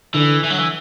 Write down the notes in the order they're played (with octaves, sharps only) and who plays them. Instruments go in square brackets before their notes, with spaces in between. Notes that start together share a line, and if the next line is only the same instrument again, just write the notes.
[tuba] D3 [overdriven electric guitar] E3
[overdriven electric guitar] E3
F#3
E3